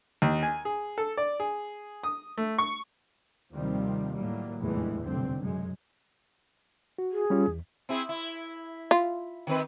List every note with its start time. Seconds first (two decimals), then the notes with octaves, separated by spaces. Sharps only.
0.22 D#2
0.43 G#5
0.65 G#4
0.98 A4
1.17 D5
1.40 G#4
2.03 D#6
2.38 A3
2.58 C#6
3.54 D#2 C3 D#3 F3 G3 C4
4.14 A2 F#3 G3 A#3
4.58 F1 A#1 E2 A2 E3 G#3
5.05 F1 B1 G2 D3 C4
5.40 F#2 G#3
6.98 F#4
7.12 G#4
7.30 G3 C#4 F4
7.48 E2
7.89 C4 E4 G#4
8.09 E4
8.91 F4
9.47 D#3 C4 B4